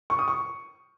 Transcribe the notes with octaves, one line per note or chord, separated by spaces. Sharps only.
C#6
D#6
C#6